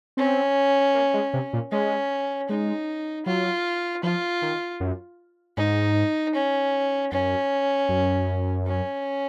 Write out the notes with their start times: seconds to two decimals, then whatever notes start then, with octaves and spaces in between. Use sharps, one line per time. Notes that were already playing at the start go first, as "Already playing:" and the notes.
0.17 C4 C#4
0.94 A#3
1.14 G#3
1.33 C3
1.53 A#2
1.72 G#3 C#4
2.49 G#3 D#4
3.26 F#3 F4
4.03 F3 F4
4.42 D#3
4.80 F#2
5.57 G#2 D#4
6.35 C#4
7.12 F#2 C#4
7.89 F#2
8.67 C#4